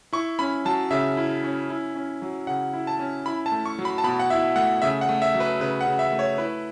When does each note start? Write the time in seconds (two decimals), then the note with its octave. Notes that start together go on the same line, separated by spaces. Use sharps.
0.13 E4 C#6
0.39 C#4 B5
0.65 F#3 A5
0.91 C#3 E5
1.17 E4
1.44 C#4
1.70 E4
1.95 C#4
2.22 F#3
2.47 C#3 F#5
2.73 E4
2.87 A5
2.99 C#4
3.26 E4 B5
3.46 A5
3.52 A3
3.66 C#6
3.79 F#3
3.85 B5
3.98 A5
4.04 B2 B5
4.20 F#5
4.30 E4 E5
4.56 A3 F#5
4.82 C#3 E5
5.01 F#5
5.09 A3
5.22 E5
5.35 F#3
5.40 B4
5.60 C#3 B4
5.81 F#5
5.87 C#3
5.99 E5
6.12 A3
6.19 C#5
6.38 E4 B4